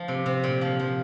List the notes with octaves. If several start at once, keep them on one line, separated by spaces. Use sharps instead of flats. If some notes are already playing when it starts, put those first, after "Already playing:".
Already playing: F3
C3
C3
A#2
F3
F3